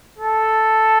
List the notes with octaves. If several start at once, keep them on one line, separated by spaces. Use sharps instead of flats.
A4